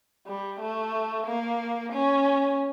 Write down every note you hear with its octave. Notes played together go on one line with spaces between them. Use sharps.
G3
A3
A#3
C#4